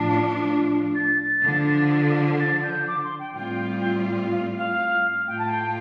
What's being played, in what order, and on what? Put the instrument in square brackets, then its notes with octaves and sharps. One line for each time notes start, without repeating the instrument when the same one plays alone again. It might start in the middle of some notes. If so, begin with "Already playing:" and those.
Already playing: [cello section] A2 F3 D4 F4 [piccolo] A5
[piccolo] A6
[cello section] D3 F3 D4
[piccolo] A6
G6
D6
C6
G5
[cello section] A2 G3 C4 F4 [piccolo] G5
[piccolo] F5
F5
[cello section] A2 A3 F4 [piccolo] G5
[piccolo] A5
G5